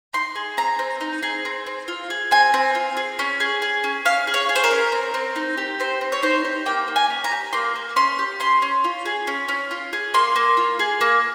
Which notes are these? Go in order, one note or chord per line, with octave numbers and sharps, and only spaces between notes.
D#4 C6
G#4
C4 A#5
C4
D#4
G#4
C4
C4
F4
G#4
C4 G#5
C4
F4
G#4
C#4
G#4
G#4
C#4
C#4 F5
G#4
C#5
G#4
C5
A#4
C#4
C4
C4
D#4
G4
C4 C5
C4
C#5
D#4 C5
G4
A#3 G5
A#3
G#5
C#4
A#5
G4
A#3 C6
A#3
C#4 C6
G4
C#4 C6
C#4
F4
G#4
C#4
C#4
F4
G#4
A#3 C6
A#3
F4
G#4
A#3